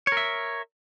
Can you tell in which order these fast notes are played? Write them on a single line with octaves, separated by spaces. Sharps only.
C#5 A#4 E5